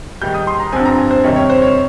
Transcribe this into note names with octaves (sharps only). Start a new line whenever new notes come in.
G#2 D#3 G3 G6
D#6
C6
A#5
G2 F3 C4 G#5
A#5
G#5
C5
C3 D#3 G3 C#5
C#5
C5
C#5